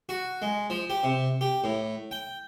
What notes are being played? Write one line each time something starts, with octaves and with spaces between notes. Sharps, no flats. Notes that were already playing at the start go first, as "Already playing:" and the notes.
F#4
G#3
F3
G4
C3
G4
A2
G5